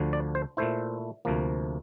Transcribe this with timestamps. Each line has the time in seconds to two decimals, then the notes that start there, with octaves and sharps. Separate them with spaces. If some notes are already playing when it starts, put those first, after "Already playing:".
Already playing: D2 D3 F3
0.13 D5
0.35 C5
0.57 A#2 A3 E4 C5
1.25 D2 C3 F3 A#3